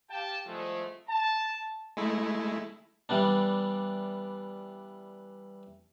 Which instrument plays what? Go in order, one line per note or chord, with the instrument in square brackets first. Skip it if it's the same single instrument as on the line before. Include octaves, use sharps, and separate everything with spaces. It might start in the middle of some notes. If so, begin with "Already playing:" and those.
[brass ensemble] G4 F5 G5 A5
C2 F3 G#3 A3
A5
[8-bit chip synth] G#3 A3 E4
[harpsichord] E3 G3 B3 D4